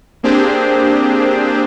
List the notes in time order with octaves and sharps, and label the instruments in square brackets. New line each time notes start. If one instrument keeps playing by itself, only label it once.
[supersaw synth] A#3 C4 D4 G4 G#4 C5